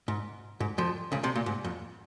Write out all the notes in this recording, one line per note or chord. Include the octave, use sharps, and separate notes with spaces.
G#2
G#2
F2 F3
C#2 C#3
C2 C3
A#2
G#2
F2